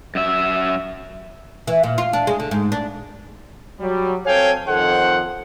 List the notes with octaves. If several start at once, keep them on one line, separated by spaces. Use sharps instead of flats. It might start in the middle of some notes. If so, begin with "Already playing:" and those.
F#2 E5
E3
A#2
F4
D4
G#3
D3
G#2
D4
F#3 G3
C4 A4 C#5 F5 G5 G#5
F2 D#3 A4 C5 F#5